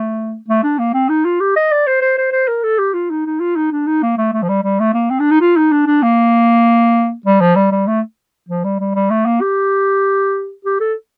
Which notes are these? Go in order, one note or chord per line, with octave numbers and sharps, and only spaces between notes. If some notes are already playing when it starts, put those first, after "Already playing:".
Already playing: A3
A3
D4
A#3
C4
D#4
F4
G4
D#5
D5
C5
C5
C5
C5
A#4
A4
G4
F4
D#4
D#4
F4
D#4
D4
D#4
A#3
A3
A3
F3
G3
G3
A3
A#3
C4
D4
D#4
F4
D#4
D4
D4
A#3
G3
F3
G3
G3
A3
F3
G3
G3
G3
A3
A#3
G4
G4
A4